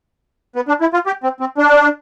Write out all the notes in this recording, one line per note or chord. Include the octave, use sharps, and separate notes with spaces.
B3
D4
E4
F4
G4
C4
C4
D4